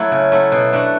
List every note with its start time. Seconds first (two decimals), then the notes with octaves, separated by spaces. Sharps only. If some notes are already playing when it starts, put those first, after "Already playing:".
Already playing: F#3 A3 E4
0.11 C#3
0.32 F#3 A3 E4
0.52 B2
0.72 A3 D4 F#4